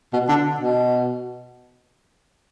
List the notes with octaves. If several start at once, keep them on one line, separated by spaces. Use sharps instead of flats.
B2
D3
B2